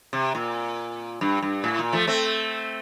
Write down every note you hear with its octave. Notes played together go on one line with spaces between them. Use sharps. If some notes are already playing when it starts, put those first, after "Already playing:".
C3
A#2
G2
G2
A2
A#2
F3 A3
A3 C4